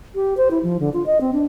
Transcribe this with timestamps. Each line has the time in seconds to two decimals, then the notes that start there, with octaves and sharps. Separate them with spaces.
0.15 G4
0.37 C5
0.51 E4
0.63 F3
0.80 D3
0.93 F4
1.06 D#5
1.21 C4
1.33 D4